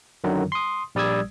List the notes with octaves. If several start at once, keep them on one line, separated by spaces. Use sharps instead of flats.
F#2 D3 D#3 F#3
C6 D#6
A#1 G3 D5 D#6 E6 G#6